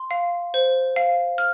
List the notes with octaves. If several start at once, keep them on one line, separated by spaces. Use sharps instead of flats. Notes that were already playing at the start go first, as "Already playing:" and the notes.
Already playing: C6
F5
C5
F5
F6